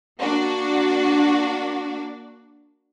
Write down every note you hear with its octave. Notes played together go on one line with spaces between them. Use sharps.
A#3 D4 F#4